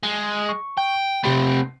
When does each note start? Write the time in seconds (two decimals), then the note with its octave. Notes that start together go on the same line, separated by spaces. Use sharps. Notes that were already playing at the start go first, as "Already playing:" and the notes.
0.03 G#3
0.49 C#6
0.77 G5
1.24 C3 A3 C4 G4 B5